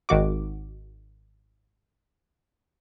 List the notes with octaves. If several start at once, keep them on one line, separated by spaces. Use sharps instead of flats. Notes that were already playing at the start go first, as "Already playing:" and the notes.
G#1 D#3 F#4 D6